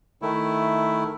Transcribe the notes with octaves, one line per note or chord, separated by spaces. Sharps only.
D#3 A3 E4